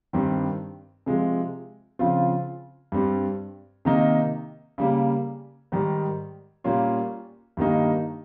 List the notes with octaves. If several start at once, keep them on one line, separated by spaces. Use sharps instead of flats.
G2 D#3 G3 C4
C3 F3 G#3
C#3 F3 C4 F4
G2 G3 C4
C3 D#3 A#3 D#4
C#3 G3 A#3
G#2 D#3 G3
A#2 G3 A#3 C#4 F4
G2 D#3 G3 A#3 D#4